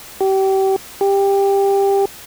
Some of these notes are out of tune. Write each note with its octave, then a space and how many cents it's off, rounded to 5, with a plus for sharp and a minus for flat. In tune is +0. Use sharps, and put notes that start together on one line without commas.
G4 -30
G4 +15